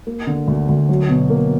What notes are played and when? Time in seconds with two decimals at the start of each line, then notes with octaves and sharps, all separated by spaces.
0.07 A#3
0.27 D3
0.48 D2
0.69 D2
0.89 F#3
1.09 B2
1.30 A#3